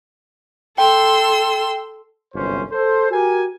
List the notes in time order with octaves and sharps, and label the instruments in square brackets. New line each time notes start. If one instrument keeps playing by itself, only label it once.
[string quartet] A4 C6 E6 [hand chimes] G5
[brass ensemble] G1 C2 F#2 C#4 C5
A4 C5
F#4 G4 A#4 G#5